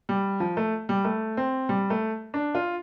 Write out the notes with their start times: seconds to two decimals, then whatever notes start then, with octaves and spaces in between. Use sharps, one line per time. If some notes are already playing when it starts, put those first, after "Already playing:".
0.09 G3
0.40 F3
0.57 A3
0.89 G3
1.05 A3
1.37 C4
1.69 G3
1.90 A3
2.34 D4
2.55 F4